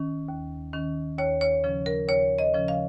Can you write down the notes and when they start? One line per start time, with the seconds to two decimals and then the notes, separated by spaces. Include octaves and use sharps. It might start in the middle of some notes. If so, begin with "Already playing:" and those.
Already playing: D#3 C#4
0.28 D#2
0.73 D#3 C#4
1.18 D#2 C#5
1.41 C#5
1.64 C#3 F3 C#4
1.86 A#4
2.08 D#2 C#5
2.39 D#5
2.54 C#3 F3 C#4
2.68 F5